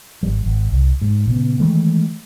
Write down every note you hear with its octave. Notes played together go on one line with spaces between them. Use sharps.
G#1 G3
G#1
C2
G#2
A#2 C#3 B3
D#3 E3 G#3 A3